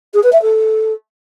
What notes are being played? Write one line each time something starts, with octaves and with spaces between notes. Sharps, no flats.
G#4
B4
E5
A4